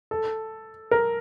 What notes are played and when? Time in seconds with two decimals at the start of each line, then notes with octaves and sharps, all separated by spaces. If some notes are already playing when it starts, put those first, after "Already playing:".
0.11 A4
0.91 A#4